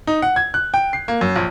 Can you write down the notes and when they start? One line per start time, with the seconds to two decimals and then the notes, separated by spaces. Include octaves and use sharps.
0.07 D#4
0.22 F#5
0.36 G#6
0.54 F#6
0.74 G5
0.93 C7
1.08 A#3
1.21 F#2
1.36 A#1